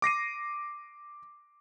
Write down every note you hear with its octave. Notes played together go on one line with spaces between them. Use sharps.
D6 A#6 C7 D#7